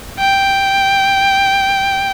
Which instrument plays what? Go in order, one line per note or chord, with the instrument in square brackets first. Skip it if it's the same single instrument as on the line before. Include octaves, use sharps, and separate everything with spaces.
[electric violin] G5